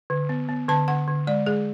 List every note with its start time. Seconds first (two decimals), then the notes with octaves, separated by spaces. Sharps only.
0.10 D3
0.29 B3
0.49 B3
0.68 D3 A5
0.88 D3 F#5
1.08 D3
1.27 G#3 D5
1.46 G#3 G#4